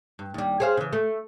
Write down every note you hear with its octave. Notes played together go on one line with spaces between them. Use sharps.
G2
D#2 G3
G#4 C5 F5
C#3 E3
A3